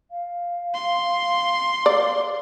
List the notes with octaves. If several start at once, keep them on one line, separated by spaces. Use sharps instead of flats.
F5
C6
D5